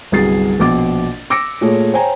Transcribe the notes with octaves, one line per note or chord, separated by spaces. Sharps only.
G1 C2 F#3 G#4 A6 C7
A#1 B2 D6 A6
D6 E6 A#6 C#7 D7
A#2 A3 G#4 C#5
C5 C#5 G5 G#5 A#5